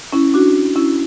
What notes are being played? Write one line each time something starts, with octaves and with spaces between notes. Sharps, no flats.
C#4 E4
D4 F#4
C#4 E4